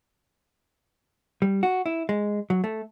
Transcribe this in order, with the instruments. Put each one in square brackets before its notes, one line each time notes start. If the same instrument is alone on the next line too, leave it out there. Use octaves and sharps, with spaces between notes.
[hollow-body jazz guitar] G3
F#4
E4
G#3
F#3
A3